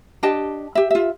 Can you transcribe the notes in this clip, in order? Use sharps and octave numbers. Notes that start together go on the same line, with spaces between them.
D4 G4 D#5 A5
G4 E5
F4 E5